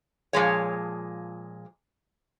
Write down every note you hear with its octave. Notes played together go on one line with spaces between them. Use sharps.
A#2 F3 G#3 C#5